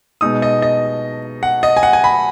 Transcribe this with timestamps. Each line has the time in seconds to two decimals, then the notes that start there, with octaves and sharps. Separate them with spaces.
0.21 B2 G#3 D#4 D#6
0.42 D#5
0.62 D#5
1.43 F#5
1.63 D#5
1.77 G#5
1.83 F#5
1.93 G#5
2.04 B5